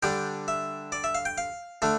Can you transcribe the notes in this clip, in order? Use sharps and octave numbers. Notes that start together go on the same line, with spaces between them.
D3 G3 D4 G5
E5
D5
E5
F5
G5
F5
D3 A3 D4